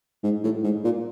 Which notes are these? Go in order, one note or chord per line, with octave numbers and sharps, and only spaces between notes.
G#2
A2
G#2
A#2